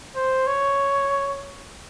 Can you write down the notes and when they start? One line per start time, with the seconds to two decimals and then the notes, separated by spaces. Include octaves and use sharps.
0.16 C5
0.47 C#5